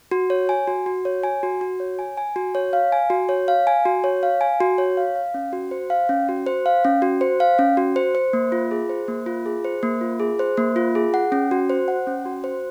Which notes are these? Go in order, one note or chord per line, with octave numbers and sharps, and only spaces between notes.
F#4
C#5
G#5
F#4
F#4
C#5
G#5
F#4
F#4
C#5
G#5
G#5
F#4
C#5
F5
G#5
F#4
C#5
F5
G#5
F#4
C#5
F5
G#5
F#4
C#5
F5
F5
C#4
F#4
C5
F5
C#4
F#4
C5
F5
C#4
F#4
C5
F5
C#4
F#4
C5
C5
A#3
F4
G#4
C5
A#3
F4
G#4
C5
A#3
F4
G#4
C5
A#3
F4
G#4
F#5
C#4
F#4
C5
F#5
C#4
F#4
C5